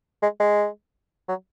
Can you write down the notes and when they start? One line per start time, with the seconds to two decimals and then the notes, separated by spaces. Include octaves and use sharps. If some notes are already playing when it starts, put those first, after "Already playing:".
0.22 G#3
0.40 G#3
1.29 F#3